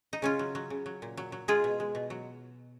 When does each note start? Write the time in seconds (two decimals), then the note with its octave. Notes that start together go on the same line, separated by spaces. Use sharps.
0.13 D#4
0.22 C#3 C#4 F4
0.39 F#3
0.55 F#3
0.70 C#3
0.86 F#3
1.02 A#2
1.17 F#3
1.32 F#3
1.48 G#3 F4 G#4
1.64 B2
1.80 G#3
1.95 B2
2.10 F#3